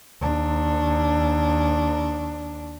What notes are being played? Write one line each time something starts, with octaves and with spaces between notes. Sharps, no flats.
D#2 D4